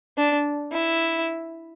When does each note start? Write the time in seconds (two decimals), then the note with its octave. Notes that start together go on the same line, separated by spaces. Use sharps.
0.17 D4
0.72 E4